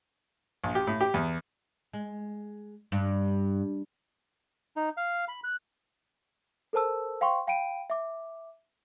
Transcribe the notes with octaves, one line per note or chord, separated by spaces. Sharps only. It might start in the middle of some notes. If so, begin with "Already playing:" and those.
A#1
G4
A2
G4
E2
G#3
G2
D#4
F5
B5
F#6
A4 A#4 C5 A5 E6
C5 F5 G5 C6 C#6
F5 G5 B5 D7 D#7
E5 D6